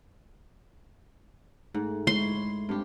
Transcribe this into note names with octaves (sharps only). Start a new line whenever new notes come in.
G#2 A3
G#3 E4 C#5 C6
G2 G#3 C4 G4